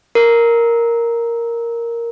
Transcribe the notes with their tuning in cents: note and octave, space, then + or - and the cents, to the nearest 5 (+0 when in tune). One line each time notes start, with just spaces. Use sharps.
A#4 +0